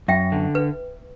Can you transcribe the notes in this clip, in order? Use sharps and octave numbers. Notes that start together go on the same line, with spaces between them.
F#2 E5 G5
D3
B4